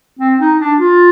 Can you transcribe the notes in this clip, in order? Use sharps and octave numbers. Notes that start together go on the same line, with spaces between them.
C4
D#4
D4
F4